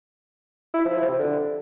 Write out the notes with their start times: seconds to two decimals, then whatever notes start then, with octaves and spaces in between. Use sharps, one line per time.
0.74 E4
0.85 F3
0.97 F3
1.08 C3
1.19 D3